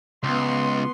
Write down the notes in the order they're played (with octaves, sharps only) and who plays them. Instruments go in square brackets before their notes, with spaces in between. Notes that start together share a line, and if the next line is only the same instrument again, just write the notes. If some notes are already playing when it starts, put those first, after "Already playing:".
[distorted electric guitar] C#2 [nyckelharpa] B3 C6